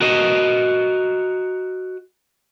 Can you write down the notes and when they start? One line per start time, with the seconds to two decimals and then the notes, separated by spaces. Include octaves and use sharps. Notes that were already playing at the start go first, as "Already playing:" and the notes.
0.01 F#4 A#4 D#5